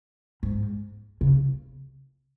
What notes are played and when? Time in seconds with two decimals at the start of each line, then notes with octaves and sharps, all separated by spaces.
0.43 G#2
1.21 C#3